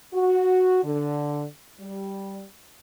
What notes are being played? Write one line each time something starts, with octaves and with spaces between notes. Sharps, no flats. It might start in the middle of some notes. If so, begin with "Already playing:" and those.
F#4
D3
G3